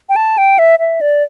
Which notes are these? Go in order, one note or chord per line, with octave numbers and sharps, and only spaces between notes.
G5
A5
G5
E5
E5
D5